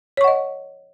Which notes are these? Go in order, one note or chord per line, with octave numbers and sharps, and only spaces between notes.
C#5 D#5 F#5 C#6